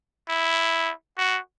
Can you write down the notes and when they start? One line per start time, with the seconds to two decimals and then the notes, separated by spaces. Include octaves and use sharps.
0.29 E4
1.18 F#4